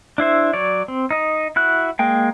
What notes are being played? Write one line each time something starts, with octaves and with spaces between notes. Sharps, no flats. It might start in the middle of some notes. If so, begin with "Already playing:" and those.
D4 E4 C5 E5
F#3 C#5 D5
C4
D#4 D#5
E4 F#4 F#6
G#3 A#3 G5